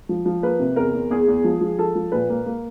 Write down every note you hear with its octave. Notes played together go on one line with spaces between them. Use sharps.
F3
F3
A#3 B4
C3
E2 A#4
E2
E2 G#4
E2
F3
F3
F3 A4
F3
A#2 B4
A#3
A#3